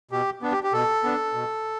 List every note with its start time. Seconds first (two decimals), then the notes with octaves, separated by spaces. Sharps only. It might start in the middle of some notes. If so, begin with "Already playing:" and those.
0.11 B2 G4
0.42 B3 D4
0.52 G4
0.64 G4
0.73 B2 A4
1.04 B3 D4
1.34 B2